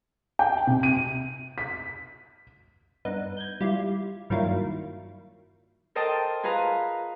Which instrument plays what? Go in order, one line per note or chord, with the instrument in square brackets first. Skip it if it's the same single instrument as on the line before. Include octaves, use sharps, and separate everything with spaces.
[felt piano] G5
C3
D#7
B6
[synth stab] G2 B3 D#4
G6 G#6
G3 E4 F4
G2 D#3 F#3 A#3 E4 F4
[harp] A4 A#4 C5 D#5 G5 A5
F4 G#4 B4 F5 A#5